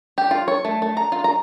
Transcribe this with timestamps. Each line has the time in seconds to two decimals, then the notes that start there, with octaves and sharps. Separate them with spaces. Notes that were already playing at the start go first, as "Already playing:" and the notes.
0.18 G4
0.31 F4
0.48 C#5
0.65 A3
0.82 A3
0.97 A#5
1.12 F4
1.24 A#5